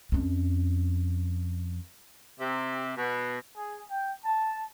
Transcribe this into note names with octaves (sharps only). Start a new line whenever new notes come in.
F2 C#4
C3
B2
G#4
G5
A5